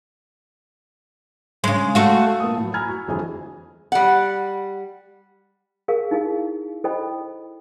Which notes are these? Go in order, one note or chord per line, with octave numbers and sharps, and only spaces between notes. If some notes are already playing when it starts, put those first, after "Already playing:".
C#3 G#3
A3 F#4 F5
A#2 B3 A#4 A5 D#6
A2 F#3
G#5 A#5 B5 E6 F6 G#6
F#4
G1 F2 E3 G#4 G#5
G3 F#5
G#4 A#4 F5
D#4 E4 G#4 F5
E4 A4 C5 D#5 G5 B5